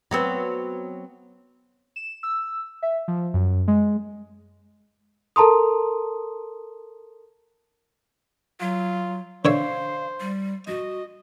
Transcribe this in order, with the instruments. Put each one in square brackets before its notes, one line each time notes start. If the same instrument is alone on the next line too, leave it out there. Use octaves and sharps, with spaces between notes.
[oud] F#3 B3 C4
[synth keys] E7
E6
E5
F3
F#2
G#3
[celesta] A4 A#4 A5 A#5 C6 D#6
[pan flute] F#3 [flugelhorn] F4
[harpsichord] D3 C#5 E5 [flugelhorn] C5 [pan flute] F5
[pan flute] G3
[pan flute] F#4 [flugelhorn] D#5